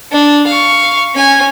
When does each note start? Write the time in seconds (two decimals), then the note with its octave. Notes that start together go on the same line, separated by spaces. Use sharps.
0.12 D4
0.47 F5 C#6
1.14 C#4 G#5